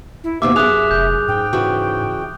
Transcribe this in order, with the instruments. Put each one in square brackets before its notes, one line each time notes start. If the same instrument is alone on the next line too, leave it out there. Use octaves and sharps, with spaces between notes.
[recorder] E4
[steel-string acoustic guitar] D#2 B2 E5 [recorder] C5 [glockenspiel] D6
[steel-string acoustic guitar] F#2 G#4 [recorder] E5 [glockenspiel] D#6 F#6 F7
[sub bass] F1 [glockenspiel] G6
[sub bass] G#2 [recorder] G5
[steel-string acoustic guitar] C#3 E3 F#4